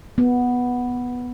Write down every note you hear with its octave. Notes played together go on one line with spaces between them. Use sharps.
B3